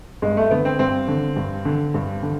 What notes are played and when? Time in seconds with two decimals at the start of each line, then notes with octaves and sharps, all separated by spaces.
0.22 G2 G#3
0.37 A3
0.51 D3 B3
0.65 C4
0.79 G2 C4
1.08 D3
1.36 G2
1.65 D3
1.94 G2
2.22 D3